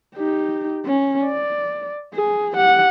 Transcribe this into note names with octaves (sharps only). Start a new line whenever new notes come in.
D#4 G4
C#4
D5
G#4
G4 F#5